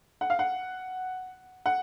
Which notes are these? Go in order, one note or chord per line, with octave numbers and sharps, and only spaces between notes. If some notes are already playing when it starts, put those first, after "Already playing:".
F#5
F5
F#5
F#5